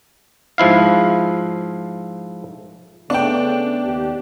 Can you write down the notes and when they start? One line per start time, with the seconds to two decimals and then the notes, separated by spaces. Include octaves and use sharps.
0.58 G#2 F3 E4 F5
3.10 C#3 A3 B3 D4 G5
3.85 D#2 G4